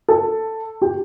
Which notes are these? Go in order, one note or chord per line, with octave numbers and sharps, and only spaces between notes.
A4
G4